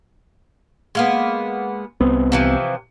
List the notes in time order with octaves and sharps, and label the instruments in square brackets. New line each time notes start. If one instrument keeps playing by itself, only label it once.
[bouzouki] G#3 A#3 B3
[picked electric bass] C2 B3 C4
[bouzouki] C3 E3 F3